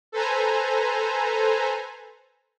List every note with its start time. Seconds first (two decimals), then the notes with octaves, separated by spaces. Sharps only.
0.12 A4 B4 C5 G#5 A#5